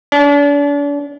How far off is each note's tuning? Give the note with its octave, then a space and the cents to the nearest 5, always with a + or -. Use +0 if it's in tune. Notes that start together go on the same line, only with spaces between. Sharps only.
D4 -40